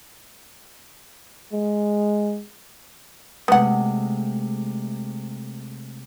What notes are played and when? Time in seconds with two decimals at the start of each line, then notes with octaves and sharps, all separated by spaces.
1.53 G#3
3.48 C3 G#3 A3 B3 F#5